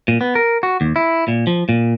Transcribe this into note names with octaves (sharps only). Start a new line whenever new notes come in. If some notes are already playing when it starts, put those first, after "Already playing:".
A#2
B3
A#4
F#4
D#2
E4
A#2
F3
A#2